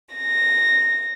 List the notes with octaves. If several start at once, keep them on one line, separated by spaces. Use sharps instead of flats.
A#6